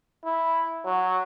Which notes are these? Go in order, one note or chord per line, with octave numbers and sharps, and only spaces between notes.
E4
F#3